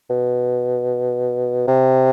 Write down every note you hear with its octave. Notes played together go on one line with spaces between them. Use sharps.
B2
C3